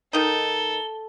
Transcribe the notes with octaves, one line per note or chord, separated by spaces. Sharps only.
D#3 D#4 A4 G7